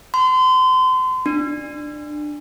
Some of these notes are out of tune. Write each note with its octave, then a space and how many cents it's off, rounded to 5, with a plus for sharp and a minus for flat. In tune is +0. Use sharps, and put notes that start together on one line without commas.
C6 -35
D4 +20